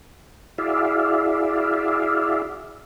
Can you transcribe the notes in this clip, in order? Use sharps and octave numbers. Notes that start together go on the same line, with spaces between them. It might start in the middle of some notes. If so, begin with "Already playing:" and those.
E4 F#4 G#4 D5 E5 F5